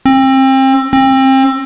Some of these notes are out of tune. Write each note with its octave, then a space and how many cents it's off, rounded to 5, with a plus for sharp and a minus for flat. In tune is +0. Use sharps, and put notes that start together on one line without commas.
C4 +30
C4 +30